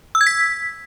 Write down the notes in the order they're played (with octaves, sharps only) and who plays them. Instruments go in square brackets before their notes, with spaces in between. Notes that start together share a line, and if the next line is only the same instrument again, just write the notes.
[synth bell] E6
G#6
B6